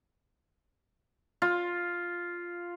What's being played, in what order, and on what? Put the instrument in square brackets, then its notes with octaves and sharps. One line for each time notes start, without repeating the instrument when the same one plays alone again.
[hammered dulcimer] F4